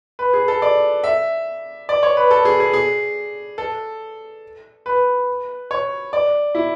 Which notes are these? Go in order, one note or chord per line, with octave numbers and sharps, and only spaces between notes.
B4
G#4
A4
D5
E5
D5
C#5
B4
A4
G#4
G#4
G#4
A4
B4
C#5
D5
E4